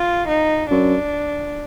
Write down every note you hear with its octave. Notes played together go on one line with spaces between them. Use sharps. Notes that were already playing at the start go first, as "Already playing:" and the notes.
Already playing: F4
D#4
F#2 D4